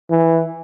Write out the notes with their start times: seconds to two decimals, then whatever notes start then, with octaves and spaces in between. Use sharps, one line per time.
0.11 E3